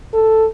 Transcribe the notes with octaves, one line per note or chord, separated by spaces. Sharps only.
A4